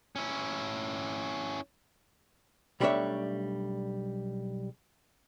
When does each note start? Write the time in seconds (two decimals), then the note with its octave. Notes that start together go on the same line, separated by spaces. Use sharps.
0.16 C#4 E4
2.80 B1 G3 A3 D4 C#5 E5